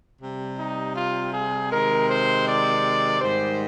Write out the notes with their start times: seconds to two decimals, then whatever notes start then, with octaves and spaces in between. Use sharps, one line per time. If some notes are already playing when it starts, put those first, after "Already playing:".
0.20 C3 G3
0.58 D#4
0.95 F4
1.33 G#4
1.70 C3 D#3 G#3 A#4
2.08 C5
2.46 D5
3.21 G#2 D#3 G3 C5